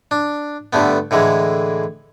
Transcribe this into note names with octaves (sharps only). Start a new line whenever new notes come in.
D4
G2 D3 A3 B3
A2 D3 E3 G#3